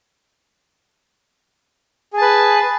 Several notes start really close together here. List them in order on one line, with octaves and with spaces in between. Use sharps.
G#4 A5 B4